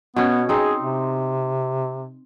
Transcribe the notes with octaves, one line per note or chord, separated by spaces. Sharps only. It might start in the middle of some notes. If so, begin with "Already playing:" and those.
B2 B3 C#4
C4 D#4 G#4
C3